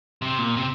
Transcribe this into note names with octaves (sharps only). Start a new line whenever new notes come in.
C3
A#2
C3